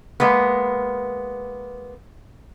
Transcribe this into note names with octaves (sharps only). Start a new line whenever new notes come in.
G#3 A#3 B3